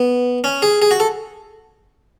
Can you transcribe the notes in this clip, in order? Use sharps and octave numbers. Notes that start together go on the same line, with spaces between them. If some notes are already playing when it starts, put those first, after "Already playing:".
Already playing: B3
C#4
G#4
G#4
F#4
A4